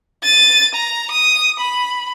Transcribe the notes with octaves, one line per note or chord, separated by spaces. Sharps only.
A6 D#7
A#5
D#6
B5